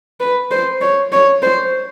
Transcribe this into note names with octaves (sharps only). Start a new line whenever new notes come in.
B4
C5
C#5
C#5
C5